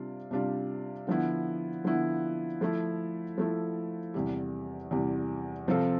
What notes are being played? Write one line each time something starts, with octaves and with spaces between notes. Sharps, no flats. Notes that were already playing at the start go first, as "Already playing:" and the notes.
Already playing: C3 G3 D4 F4
C3 G3 D4 F4
D3 F3 B3 E4
D3 F3 B3 E4
F3 A3 E4
F3 A3 E4
E2 C3 G3
E2 C3 G3
C3 F3 C4 F4 A4